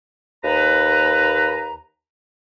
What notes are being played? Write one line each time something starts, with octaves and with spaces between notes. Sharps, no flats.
D#2 B4 A#5